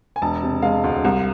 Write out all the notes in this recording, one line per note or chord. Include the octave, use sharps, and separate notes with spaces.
G#5
E1 A5
C3
G#3 F5
D2
C2